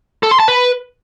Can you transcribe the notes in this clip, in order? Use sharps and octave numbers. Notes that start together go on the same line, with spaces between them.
A4
C6
A5
B4